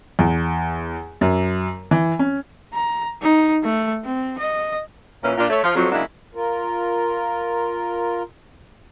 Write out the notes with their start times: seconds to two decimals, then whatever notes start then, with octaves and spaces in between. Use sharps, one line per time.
0.19 E2
1.21 F#2
1.91 E3
2.19 C#4
2.73 A#5
3.22 D#4
3.63 A3
4.04 C4
4.39 D#5
5.22 A#2 E3 C#4
5.38 A#2 D4 F4
5.50 A3 C#5
5.62 F3 F4
5.75 F2 F#3
5.91 C#3 F#3 G#3 A#3 D4 E4
6.35 F4 A#4